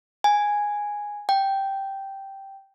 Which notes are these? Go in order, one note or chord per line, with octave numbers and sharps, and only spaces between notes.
G#5
G5